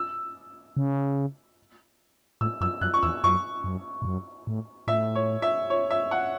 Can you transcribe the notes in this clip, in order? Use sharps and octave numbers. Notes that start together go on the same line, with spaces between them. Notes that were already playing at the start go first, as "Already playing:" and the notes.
Already playing: E6
C#3
A2 E6
F#2 E6
F#2 F#6
C#6
E2 E6
F#2 C#6
F#2
A2
F#2
A2
A2 E5
C#5
E5
C#5
E5
F#5